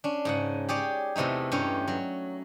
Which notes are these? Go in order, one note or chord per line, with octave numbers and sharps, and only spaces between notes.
C#4 D4
G#2 C#3 F#5
G4 G#4 C#5 D5
E2 C3 E3 A3 D#4
G2 C#4 G4 C#5
F#3